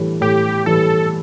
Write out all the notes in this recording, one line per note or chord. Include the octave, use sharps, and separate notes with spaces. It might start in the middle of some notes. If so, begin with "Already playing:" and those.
Already playing: A2 E3 G3
A2 G4
E3 G3 A4